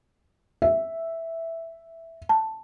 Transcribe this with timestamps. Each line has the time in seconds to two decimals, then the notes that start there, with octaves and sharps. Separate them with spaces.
0.62 E5
2.29 A5